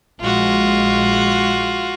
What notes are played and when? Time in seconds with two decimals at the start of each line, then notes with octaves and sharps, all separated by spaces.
0.21 A#1 G#3 F4 F#4